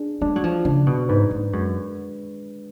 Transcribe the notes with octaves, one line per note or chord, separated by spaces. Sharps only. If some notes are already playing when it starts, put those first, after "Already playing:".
Already playing: D4 G#4
G#3 D4
F#3
F3
C#3 D4
B2
G#2 B4
G#2
F#2 G#3